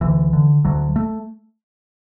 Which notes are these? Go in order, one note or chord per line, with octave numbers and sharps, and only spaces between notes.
D2 E3
D3
D2 F#3
A3